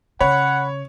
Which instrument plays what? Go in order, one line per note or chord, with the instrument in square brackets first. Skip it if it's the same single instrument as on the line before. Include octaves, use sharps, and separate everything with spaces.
[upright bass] C#3 [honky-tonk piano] C#5 [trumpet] F#5 [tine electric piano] B5